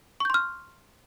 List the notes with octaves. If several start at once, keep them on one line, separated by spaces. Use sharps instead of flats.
C6 C#6 F6 G6